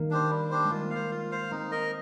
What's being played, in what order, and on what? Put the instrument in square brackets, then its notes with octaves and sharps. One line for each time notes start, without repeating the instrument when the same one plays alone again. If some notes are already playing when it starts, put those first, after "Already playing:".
Already playing: [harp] D#3 A#3
[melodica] D4 G4 C5
G3
D4 G4 C5
[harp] G#3
[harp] A#3 [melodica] F4
[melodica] C5 F5
F4
C5 F5
[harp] C4 [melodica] D#4
[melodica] A#4 D#5